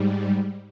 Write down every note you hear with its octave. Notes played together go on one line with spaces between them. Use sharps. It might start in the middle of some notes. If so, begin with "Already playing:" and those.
Already playing: G#2 G3